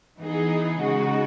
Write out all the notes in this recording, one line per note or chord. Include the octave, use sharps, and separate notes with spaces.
E3 B3 D#4 G#4
C#3 G#3 D#4 F#4